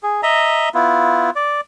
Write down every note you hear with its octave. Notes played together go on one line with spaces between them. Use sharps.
G#4
D#5 E5 A#5
B3 E4 F4
D5